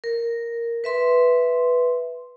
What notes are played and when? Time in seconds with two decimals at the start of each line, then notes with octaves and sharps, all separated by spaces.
0.04 A#4
0.84 B4 E5 C6